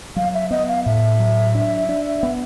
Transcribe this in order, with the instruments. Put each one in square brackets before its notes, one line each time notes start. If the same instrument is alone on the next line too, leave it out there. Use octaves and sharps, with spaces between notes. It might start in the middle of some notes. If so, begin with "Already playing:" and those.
[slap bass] F#3 [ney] F5
[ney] E5
[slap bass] B3 [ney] D#5
[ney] F5
[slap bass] A2 [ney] E5
[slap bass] F#3
D4
D4
B3